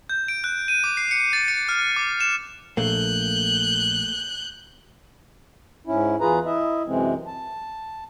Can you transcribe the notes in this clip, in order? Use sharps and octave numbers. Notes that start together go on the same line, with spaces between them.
G6
D7
F#6
D#7
D6
C7
C#7
A6
C#7
F6
D6
E7
A#1 A3 A#3 F#6 G6
G#2 C#4 E4
E2 E3 F4 G#4 B4 A#5
E4 D#5 E5
F#2 C3 E3 G#3 C4
A5